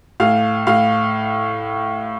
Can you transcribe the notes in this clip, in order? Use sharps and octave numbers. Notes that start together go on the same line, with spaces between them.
A2 F5
A2 F5